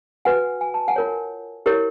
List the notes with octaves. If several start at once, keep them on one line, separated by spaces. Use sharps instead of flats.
F#4 B4 F#5 G#5
G#5
A5
F#5 G#5
F4 A#4 C#5
E4 G4 A#4 C#5